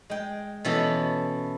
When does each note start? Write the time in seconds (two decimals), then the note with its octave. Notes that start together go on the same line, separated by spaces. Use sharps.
0.10 G#3 G5
0.65 B2 E3 B3 C#4 F#4 A4